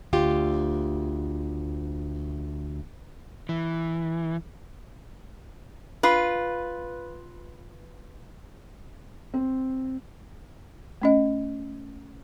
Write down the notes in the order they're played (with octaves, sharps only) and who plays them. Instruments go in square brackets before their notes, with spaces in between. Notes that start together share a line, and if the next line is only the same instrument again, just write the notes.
[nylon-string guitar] D2 F4 G4
[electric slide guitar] E3
[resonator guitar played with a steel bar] F4 B4
[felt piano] C4
[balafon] A3 C#4 D#5